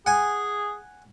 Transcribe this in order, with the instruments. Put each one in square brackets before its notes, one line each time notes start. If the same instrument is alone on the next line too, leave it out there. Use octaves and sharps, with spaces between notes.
[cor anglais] G#4 [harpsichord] F#5 G#5